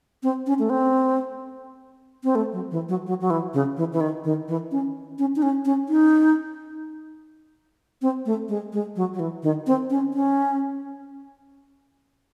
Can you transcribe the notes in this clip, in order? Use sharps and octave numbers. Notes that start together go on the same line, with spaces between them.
C4
C#4
A3
C4
C4
A3
F#3
E3
F#3
F#3
F#3
E3
C#3
E3
E3
D#3
D#3
E3
C#4
C#4
D#4
C#4
C#4
D#4
C4
A3
G#3
G#3
F#3
F#3
E3
D#3
C4
C#4
C#4